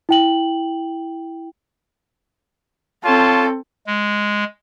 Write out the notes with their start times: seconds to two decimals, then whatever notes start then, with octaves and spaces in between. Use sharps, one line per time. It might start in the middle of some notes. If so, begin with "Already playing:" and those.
0.09 E4 G5 F#7
3.04 C4 F4 A4 C#5 A5
3.87 G#3